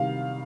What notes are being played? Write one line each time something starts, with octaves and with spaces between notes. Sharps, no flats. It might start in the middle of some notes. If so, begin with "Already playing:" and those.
Already playing: C3 D#3 G3 F5